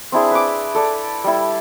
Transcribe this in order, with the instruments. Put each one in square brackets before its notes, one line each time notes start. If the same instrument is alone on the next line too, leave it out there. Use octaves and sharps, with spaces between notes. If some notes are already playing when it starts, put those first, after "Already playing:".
[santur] C4 D4 E4 G#4
B4 D6
A4 D5
G3 E4